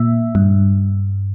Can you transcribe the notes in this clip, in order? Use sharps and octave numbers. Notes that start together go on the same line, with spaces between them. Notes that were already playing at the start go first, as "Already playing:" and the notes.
Already playing: A#2 E5
G2